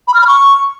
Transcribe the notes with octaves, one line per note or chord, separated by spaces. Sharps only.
B5
F6
B5
C#6